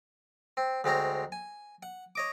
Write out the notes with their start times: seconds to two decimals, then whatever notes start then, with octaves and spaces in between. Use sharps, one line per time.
0.57 C4
0.84 D2 G#3 C4 C#5 A#5
1.32 G#5
1.83 F#5
2.15 C#5 D#5 D6